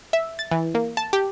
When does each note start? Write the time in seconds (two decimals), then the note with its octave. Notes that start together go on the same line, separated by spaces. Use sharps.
0.13 E5
0.39 A6
0.51 E3
0.75 A#3
0.97 A5
1.13 G4